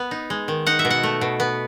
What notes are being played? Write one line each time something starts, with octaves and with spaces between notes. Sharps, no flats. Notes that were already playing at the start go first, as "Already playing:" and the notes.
Already playing: B3
D#4
G#3
D#3
D#4 F#5
E5
B2
F#5
A3
B2
B3